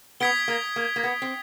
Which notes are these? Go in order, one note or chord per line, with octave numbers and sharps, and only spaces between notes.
B3 D#6 G#6 B6 D7 G7
A#3
A#3
A#3
B3
C4